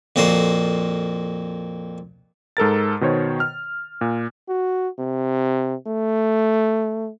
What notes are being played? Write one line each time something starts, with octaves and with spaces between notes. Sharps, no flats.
F2 A#2 F#4 A4 C6
G#2 A4 A#4 A6
B2 D#3 C5 C#5
F6
A#2
F#4
C3
A3